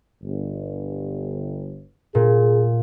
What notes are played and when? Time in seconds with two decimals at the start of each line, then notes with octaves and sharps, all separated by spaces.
0.22 G1
2.15 A#2 G#4